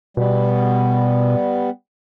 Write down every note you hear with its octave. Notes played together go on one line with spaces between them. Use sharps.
B2 G3 B3